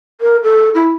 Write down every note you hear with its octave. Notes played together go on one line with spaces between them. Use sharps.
A#4
A4
E4